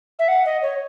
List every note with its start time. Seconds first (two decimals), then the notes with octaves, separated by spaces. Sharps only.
0.19 E5
0.28 F#5
0.45 D#5
0.62 C#5